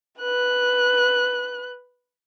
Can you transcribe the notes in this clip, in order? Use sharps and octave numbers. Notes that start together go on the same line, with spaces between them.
B4 F#6